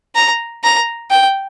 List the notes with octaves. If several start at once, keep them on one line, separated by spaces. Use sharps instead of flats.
A#5
A#5
G5